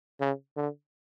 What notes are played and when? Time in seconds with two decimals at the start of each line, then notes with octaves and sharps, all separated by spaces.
0.21 C#3
0.57 D3